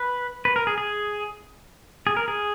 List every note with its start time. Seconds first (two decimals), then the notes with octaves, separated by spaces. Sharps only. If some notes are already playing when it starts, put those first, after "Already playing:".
Already playing: B4
0.45 B4
0.56 A#4
0.67 G#4
0.78 G#4
2.07 G#4
2.17 A#4
2.28 G#4